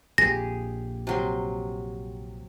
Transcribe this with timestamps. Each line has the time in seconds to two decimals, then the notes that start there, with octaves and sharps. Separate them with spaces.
0.18 A#1 F2 G4 G#4 A#6
1.07 C3 F#3 C6